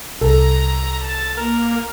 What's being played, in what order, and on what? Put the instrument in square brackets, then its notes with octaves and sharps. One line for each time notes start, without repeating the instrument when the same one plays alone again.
[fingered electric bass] C2 [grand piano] A4 [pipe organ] A#5
[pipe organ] A5
[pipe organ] A#3 [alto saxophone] A#4